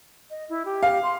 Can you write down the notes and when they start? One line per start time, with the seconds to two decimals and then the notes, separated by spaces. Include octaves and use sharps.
0.30 D#5
0.49 E4
0.65 G4
0.83 F5
1.03 C6